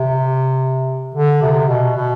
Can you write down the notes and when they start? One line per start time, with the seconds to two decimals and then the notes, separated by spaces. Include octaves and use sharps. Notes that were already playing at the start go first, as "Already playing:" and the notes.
Already playing: C3
1.15 D3
1.42 C3
1.69 B2
1.96 B2